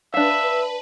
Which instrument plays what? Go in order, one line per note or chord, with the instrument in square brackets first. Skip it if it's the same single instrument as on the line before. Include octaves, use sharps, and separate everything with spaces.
[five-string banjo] D4 F5 [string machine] B4 [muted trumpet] E5